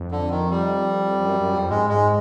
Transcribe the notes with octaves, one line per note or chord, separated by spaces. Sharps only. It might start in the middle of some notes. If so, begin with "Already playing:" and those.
Already playing: F2
D3
D#3
G3
F2
F#2
F#2
F2
G#2 G#3
G#3